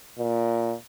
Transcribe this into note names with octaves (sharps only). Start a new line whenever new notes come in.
A#2